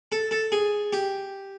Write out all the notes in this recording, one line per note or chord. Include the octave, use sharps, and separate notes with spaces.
A4
A4
G#4
G4